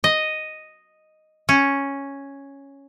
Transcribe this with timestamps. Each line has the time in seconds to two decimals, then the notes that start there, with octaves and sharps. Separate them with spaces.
0.04 D#5
1.49 C#4